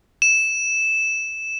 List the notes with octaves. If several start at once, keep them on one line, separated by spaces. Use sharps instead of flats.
E7